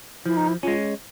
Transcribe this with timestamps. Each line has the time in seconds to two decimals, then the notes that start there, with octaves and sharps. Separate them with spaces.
0.26 F3 E4
0.37 D#4
0.48 E4
0.63 G#3 C#4 F4